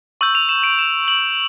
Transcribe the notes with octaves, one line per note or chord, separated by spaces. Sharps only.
C#6 E6 G6 F#7
F7
E7
D7
E7
F#7